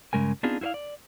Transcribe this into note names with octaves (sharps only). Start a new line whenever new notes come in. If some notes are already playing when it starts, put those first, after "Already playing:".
G2 C#3 G#3 A#4 G#5
B3 C4 D4 D#4 F4 G#4
E4 F4 C5 D5 F5
D5